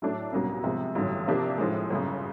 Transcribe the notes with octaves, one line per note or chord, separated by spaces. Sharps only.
A2 F#3 A3 D4
C2 B2 F#3 A#3 C#4
C3 F3 G#3
A1 G2 D3 F#3
C3 F3 A#3 D4 G4
A2 F3 G#3
G1 F#2 C#3